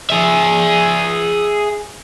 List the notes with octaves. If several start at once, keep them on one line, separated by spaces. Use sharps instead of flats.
G#4 E5